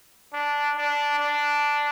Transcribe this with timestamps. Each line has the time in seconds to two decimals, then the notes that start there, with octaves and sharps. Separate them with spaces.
0.33 D4
0.77 D4
1.19 D4